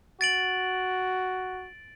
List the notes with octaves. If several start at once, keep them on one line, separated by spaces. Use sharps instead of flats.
F#4 A6 D7 F#7